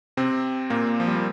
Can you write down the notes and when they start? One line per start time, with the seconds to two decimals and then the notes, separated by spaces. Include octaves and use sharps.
0.17 C3 C4
0.70 A#2 A#3
1.00 F3
1.07 G3
1.16 A#3